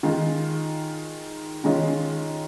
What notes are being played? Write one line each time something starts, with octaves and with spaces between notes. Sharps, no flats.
D#3 G#3 F4
D#3 G#3 C#4 F4